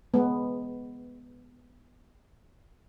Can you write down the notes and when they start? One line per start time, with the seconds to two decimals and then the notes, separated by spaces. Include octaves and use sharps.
0.14 G#3 B3